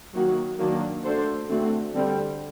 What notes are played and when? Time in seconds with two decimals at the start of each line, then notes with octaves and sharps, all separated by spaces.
0.15 D#3 F#3 A#3 F#4
0.59 D#3 F#3 A#3 D4
1.04 A3 D4 F#4 A4 C5
1.48 D3 A3 C4 F#4
1.93 D3 G3 C4